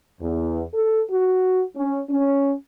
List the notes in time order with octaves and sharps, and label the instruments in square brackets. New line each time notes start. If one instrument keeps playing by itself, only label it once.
[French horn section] E2
A4
F#4
C#4
C#4